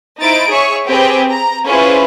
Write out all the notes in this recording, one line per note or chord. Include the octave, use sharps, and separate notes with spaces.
D#4 E4 C5 A6 D7
G#4 C#5 E5 C#6
C4 G4 G#4 B4 G5
A#5
C#4 E4 F4 G#4 B4 C5